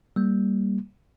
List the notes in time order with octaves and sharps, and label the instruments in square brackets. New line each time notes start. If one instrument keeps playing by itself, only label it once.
[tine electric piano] G3 A#3